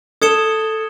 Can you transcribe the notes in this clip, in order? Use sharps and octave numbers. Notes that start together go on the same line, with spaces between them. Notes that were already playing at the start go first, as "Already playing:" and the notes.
A4 D#6 G#6 C#7 E7 G7